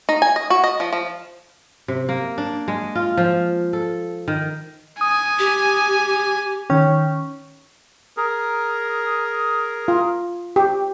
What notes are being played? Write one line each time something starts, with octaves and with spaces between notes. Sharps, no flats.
D#4
G#5
D#5
F#4
D#5
F3
F3
C3
A#3
D4
G#3
F4
F3
A4
D#3
G#5 D#6
G4
D#3 C#4 G5
G#4 A#4
F4
G4